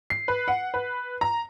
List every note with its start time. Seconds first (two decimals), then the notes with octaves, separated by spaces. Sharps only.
0.10 C7
0.28 B4
0.48 F#5
0.74 B4
1.21 A#5